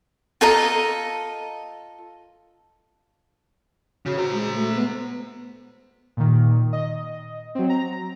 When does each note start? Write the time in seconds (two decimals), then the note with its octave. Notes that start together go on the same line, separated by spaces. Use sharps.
0.41 F4 A4 D#5 A#5
4.06 C#3 F#4
4.18 F#4 C5 A#5
4.33 G#3
4.55 A3
4.75 B3
6.17 A#2 D#3
6.73 D#5
7.55 F#3 C4
7.69 A#5